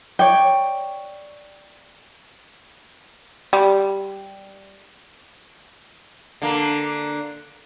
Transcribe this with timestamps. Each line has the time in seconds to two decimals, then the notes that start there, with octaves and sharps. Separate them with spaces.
0.19 C#5 D5 G5
3.53 G3
6.42 D3 A#3